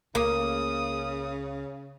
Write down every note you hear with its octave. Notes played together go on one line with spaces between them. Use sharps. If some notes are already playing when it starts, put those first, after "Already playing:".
C#2 C#3 A#3 D#6